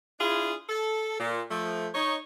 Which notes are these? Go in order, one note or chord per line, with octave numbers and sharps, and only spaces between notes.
D4 E4 F4 G#4
A4
A#2
F3 A3
D#4 C#5